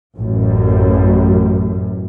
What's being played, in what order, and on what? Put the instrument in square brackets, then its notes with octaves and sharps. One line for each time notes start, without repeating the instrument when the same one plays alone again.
[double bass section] A1 F#2